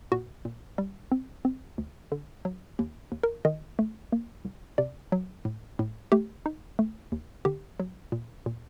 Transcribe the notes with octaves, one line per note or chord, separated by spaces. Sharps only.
A#2 F#4
A#2
G3
C4
C4
D2
D3
F#3
D#2
D#2
A#4
D#3 D#5
A3
A#3
C2
C3 D5
F#3
A2
A2
A3 G4
D#4
A3
D#2
D3 G4
F#3
A#2
A#2